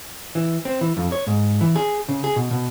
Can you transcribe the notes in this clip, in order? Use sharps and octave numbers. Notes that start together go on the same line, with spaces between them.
E3
C4
E3
F2
C#5
G#2
E3
G#4
C#3
G#4
B2
B2